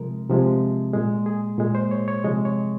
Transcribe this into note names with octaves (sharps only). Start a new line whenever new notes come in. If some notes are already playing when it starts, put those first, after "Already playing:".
Already playing: C3 F3 G#3 A#4
C3 F3 G#3
A#2 G#3
G#4
A#2 G#3
C5
C#5
C#5
C3 F3 G#3 D#5
C#5